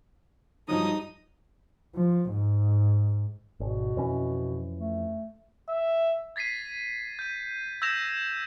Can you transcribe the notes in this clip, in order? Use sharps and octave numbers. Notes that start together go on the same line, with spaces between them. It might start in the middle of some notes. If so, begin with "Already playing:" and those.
G2 F3 F#3 D#4 D#6
F3
G#2
G#1 B2
F2 E3 C#4
A3
E5
G#6 A6 B6 C7 D#7
G6 D#7
E6 G6 G#6 A#6 E7 F7